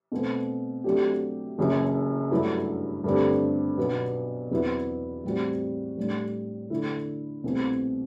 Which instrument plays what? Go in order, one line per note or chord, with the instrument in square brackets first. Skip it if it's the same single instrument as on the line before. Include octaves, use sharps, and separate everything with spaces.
[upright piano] B2 A3 C4
C3 F#3 A3 D4 G4
F#1 F#2 E3
G2 F#3 A3 E4
G2 D3 A3 C4 G4
B1 B2 F#3 B3
E2 C3 F#3 B3 E4
A2 E3 G3 C4 F#4
A2 G3 D4
D3 A3 E4
C2 B2 A3 C4